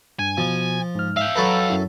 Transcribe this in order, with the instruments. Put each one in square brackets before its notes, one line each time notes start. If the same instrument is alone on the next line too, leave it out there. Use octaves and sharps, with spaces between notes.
[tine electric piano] G2 [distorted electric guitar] G#5
[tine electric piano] B2 [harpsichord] F3
[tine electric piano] G#2 F6
[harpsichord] E5 [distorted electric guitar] F5 G5
[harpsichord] F#3 A4 B4 [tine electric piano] A#5 B5 C#6
[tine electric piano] F#2 E4